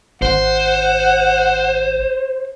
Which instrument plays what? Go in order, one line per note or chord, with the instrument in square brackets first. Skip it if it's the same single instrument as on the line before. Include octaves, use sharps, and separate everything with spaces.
[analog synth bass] G#1 [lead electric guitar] C5 [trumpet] F#5